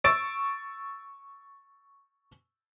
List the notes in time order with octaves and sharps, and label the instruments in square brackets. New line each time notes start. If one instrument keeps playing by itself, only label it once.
[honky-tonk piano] C#6 E6 A6 D7